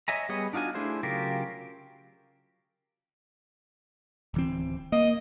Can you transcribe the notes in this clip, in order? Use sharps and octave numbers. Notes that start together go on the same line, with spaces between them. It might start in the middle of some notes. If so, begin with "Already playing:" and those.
C#5 D#5 E5 G#5 A#5
G3 B3 G#4 C#5 D#5
D4 D#4 F4 F#4 G#5
A3 D4 E4 G#4 C5
C#3 F#3 F4 G4 A#4
D1 E3 C4
A#3 D#5